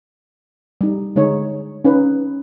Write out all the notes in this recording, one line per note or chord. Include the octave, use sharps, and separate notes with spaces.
G3 D#4
D3 G#3 D#4 C#5
C#4 D#4 B4